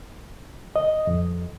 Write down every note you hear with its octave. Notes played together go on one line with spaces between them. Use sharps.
D#5
F2